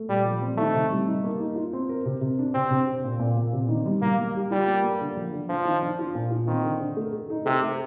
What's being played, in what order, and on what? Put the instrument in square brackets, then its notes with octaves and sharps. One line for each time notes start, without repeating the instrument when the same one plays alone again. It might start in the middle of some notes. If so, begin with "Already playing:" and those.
Already playing: [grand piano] A3
[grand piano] A#2 [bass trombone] G3
[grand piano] F3
C4
[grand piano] D#3 [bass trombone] A3
[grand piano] C3
G3
D#4
A#3
D#4
F4
C4
A#4
C3
C3
D4
[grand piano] C3 [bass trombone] C4
[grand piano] C3
C3
A#2
A#2
A#2
C3
D#3
G3
[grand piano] G3 [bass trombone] A#3
[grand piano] G3
G4
[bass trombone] G3 [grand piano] F4
[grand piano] A#3
A#3
D3
F3
D3
[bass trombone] F3 [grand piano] D4
[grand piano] D#3
D4
F4
A#2
F4
[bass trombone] D#3 [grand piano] C4
[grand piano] D3
D3
A3
A3
D#4
[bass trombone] C3 [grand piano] A3
[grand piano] A3